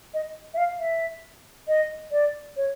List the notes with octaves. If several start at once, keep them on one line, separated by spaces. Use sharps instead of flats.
D#5
E5
F5
E5
D#5
D5
C#5